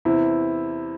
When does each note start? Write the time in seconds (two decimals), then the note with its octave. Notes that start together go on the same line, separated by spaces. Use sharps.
0.05 E2 C3 E3 E4